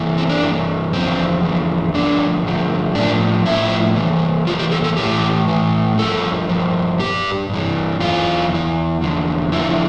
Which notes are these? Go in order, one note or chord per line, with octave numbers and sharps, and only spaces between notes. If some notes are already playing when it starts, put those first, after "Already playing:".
Already playing: G2 E3
C4
D4
G2 E3
E2 D3 F3 C4
E2 D3 F3
G2 D3 F3 D4
G2 D3 F3
A2 F3 D4
A2 F3 E4
G2 E3
G2 E3 F4
G4
A4
A4
A2 E3 G4
A2 E3
G2 F3 A4
G2 F3
G2 E3 G4
G2 E3
E2 E3 F4
E2 E3
E2 D3 F3
E2 D3 F3 E4